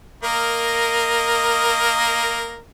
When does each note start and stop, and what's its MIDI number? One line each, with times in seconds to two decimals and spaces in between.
0.23 2.61 58
0.23 2.61 70
0.23 2.61 75